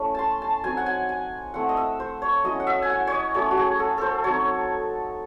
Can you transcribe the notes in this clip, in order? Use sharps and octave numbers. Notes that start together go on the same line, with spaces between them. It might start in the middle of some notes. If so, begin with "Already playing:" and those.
Already playing: A3 C#4 E4
A5 C6
A5
F#3 C4 D#4 G#5
F#5
G#5
G#5
A3 C4 E4 F#5
D#5
E5
C5
C#5
F#3 C#4 E4 D#5
F#5
E5
G#5
F#5
C#5 D#5
F#3 A3 C#4 E4 C#5
F#4
G#4
A4
A4 C5
F#3 C4 D#4 C#5